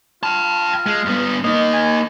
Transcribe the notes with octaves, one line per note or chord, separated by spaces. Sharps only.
F4 G5 A5
G#3
G2 B3
A#3 D#4 D#5
G#5